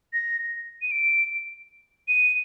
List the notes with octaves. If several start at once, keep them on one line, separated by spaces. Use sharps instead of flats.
A#6
D#7
D7
D#7